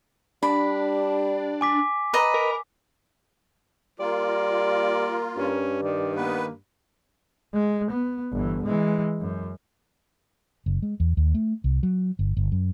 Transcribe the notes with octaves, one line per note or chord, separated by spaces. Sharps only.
G3 D4 B5
G#5 D6 B6
B4 D#5 A#5
A#4
G3 A#3 F4 A#4 D5
G2 C#4
D#3 D5
A#3 B3 B4
G#3
B3
G1 E3
E3 G#3
F#2
F#1
G#3
E2
D#2
A3
C2
F#3
G1
G1
F#2